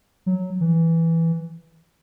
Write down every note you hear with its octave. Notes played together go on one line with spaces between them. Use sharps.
F#3
E3